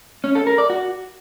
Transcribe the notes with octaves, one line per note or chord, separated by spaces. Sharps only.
C#4
A4
A#4
D5
F#4